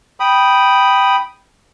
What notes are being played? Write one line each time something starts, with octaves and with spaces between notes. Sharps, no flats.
G5 B5 D#6